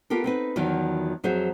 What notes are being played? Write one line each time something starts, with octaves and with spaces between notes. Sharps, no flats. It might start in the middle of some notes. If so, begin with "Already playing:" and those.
B3 F4 G4 A4 A#4
C4 D#4 B4
E2 D#3 F3 F#3 E4
F2 F#3 G#4 C5 E5